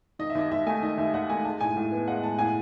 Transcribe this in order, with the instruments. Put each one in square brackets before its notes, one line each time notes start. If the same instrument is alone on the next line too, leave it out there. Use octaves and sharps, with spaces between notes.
[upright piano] D#3 D#5
E5
D#2 D#5
D#2 E5
A3 G#5
D#3 D#5
D#2 E5
D#2 F#5
A3 G#5
G#3 A5
A2 G#5
A2
B3
G#3 F#5
A2 A5
A2 G#5